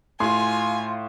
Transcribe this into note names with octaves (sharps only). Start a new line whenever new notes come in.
A2 F4 G#5 C6